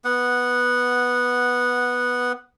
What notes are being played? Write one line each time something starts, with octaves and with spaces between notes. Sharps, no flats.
B3 F#5